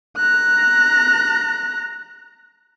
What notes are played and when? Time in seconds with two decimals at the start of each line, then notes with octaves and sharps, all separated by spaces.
0.17 A#5 F#6